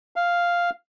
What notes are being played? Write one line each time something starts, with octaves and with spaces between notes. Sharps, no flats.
F5